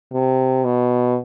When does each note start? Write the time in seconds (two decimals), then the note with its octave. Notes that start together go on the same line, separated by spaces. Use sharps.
0.13 C3
0.64 B2